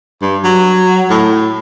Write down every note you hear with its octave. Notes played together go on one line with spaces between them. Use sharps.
G2
F#3
A2